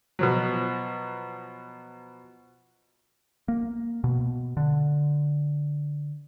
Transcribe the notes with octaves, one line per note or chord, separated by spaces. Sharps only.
B2 F3 F#3
A#3
B2
D3